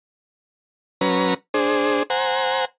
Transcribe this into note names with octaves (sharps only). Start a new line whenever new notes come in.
F#3 C#4 B4 A#5
D4 G#4 C5
C5 F#5 G#5 A#5